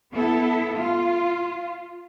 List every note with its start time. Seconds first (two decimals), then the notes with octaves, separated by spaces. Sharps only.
0.13 B3 E4 A4
0.74 F4